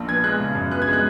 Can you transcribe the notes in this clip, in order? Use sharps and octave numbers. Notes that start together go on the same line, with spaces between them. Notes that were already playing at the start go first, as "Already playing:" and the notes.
Already playing: A#1 A#2
B3 G#6
G#3 F#6
C#3
F#2
B3 F#6
G#6
G#3
F#6